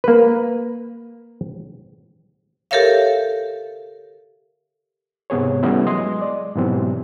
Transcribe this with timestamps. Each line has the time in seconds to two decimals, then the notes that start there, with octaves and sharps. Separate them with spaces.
0.04 A#3 B4
2.71 G4 A4 A#4 C#5 E5 F5
5.30 G#2 C3 B3 G#4 C#5
5.63 E3 G3 A3 B3 C#4 E4
5.86 F#3 G#3 D#5 C6
6.21 D5
6.56 G#2 B2 E3 F#3 C4 G4